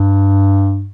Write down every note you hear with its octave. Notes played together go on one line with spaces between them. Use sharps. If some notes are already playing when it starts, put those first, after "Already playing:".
Already playing: G2